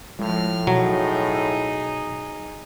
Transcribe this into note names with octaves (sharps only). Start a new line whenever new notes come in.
A2 F3 G#3 F6
B2 F#3 D#4 G#4